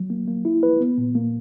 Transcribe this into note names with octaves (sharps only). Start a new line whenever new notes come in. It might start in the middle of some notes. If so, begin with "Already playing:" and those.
Already playing: F#3
A#3
A#3
E4
B4
B3
A#2
A#3